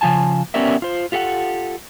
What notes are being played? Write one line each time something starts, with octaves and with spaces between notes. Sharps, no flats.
C#3 F3 F4 G#5 A5
B3 C#4 G4 A#4 D5 E5
F4 C5
F4 G4 A4 F5 F#5